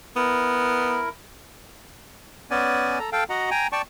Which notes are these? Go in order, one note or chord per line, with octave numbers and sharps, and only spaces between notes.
B3 E4 A#4
B3 C#4 D5 G#5
A4 A#5
A4 F5 G5
F#4 D#5 F#5 A#5
G5 G#5 A#5
D5 G5 A5 C#6